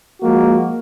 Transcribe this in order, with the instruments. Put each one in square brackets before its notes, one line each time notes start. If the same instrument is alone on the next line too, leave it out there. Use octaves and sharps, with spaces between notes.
[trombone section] F3 G#3 A#3 F#4